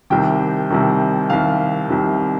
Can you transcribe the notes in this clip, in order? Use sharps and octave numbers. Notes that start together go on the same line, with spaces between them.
C2 C3 D#3 G5
C2 C3 D#3
C2 C3 D#3 F5
C2 C3 D#3